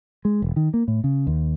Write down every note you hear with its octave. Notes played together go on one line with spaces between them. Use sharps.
G#3
E1
D#3
A#3
A2
C#3
D#2